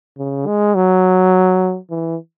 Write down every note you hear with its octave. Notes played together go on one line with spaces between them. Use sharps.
C#3
G#3
F#3
E3